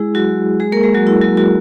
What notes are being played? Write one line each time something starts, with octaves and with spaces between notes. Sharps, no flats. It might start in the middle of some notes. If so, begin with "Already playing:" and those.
Already playing: G#3 E4 G#4
F#3 F#4
G#3 G#4
A#3 A#4
G#3 G#4
F#3 F#4
E4
F#3 F#4
F#3 F#4